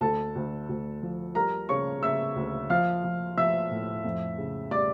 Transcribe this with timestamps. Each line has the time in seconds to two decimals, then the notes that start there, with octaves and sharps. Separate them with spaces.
0.01 D2 A4 A5
0.36 D2
0.69 D2
1.03 F3
1.35 G3 A#4 A#5
1.69 C#3 C#5 C#6
2.03 C#3 E5 E6
2.36 D2
2.70 F3 F5 F6
3.04 F3
3.38 F3 E5 E6
3.71 A2
4.04 F2
4.38 C#3
4.71 G3 D5 D6